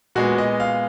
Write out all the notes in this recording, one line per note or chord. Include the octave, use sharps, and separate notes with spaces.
A#2 G#3 B3 F#4
D#5
F5